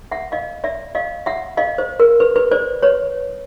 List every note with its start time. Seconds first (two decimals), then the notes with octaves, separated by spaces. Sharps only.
0.11 E5 F#5
0.32 D#5 F5
0.64 D5 E5
0.95 D#5 F5
1.26 E5 F#5
1.57 D#5 F5
1.78 C5
2.00 A#4
2.20 B4
2.36 B4
2.52 C5 D5
2.82 B4 C#5